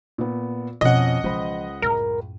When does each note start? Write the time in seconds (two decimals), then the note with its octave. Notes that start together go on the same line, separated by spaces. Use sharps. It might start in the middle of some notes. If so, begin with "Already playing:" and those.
0.18 A#2 B3
0.81 F2 B2 F3 C#4 D#5 F#5
1.24 C#2 E3 F3 C5 B5
1.82 F#2 A2 A#4